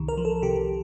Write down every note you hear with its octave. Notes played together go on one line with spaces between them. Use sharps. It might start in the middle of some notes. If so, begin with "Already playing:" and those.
Already playing: C2 D#3
A#4
F3
A4
C3 G4